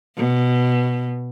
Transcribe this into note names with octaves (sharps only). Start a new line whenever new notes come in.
B2